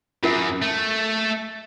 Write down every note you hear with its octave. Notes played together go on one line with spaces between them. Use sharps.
F#2 F4 A#4 E5
A3